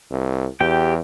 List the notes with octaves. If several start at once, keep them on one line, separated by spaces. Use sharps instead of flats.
C2
E2 G4 G5